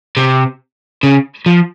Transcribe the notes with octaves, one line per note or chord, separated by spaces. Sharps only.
C3
C#3
F3